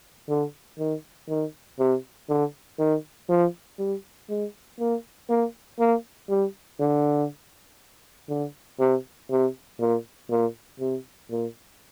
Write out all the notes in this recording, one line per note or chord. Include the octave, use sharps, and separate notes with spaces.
D3
D#3
D#3
C3
D3
D#3
F3
G3
G#3
A#3
A#3
A#3
G3
D3
D3
C3
C3
A#2
A#2
C3
A#2